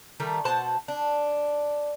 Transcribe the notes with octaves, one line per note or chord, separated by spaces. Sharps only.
D#3 G3 A3
B2 C5 F#5 A5
D4